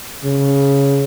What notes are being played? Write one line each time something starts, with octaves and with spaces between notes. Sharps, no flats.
C#3